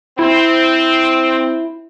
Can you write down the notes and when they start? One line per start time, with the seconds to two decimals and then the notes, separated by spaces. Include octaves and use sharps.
0.19 C4 E4